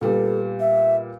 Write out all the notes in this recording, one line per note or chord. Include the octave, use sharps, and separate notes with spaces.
A#2 G3 B3 A4
E5